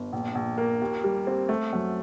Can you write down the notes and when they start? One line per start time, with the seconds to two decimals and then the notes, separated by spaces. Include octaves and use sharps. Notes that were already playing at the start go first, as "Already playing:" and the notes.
Already playing: G1
0.12 A#1
0.35 A#1
0.58 A#3
0.81 D#2
1.04 G3
1.27 C4
1.49 A3
1.73 F#2